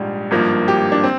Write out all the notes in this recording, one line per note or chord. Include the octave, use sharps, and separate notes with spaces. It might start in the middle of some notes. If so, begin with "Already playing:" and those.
Already playing: A#1 G#2 G3
G#1 G2 F3 A#3
G4
D4
C4